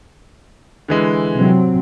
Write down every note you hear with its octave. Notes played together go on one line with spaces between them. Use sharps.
D3 E3 G#3
C3 F#3 C4